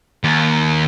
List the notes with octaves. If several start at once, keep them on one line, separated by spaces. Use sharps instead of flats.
D#2